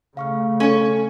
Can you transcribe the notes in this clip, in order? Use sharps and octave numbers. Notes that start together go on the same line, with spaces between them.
C#3 A3 F5 C#6 F6
C#4 A4 C#5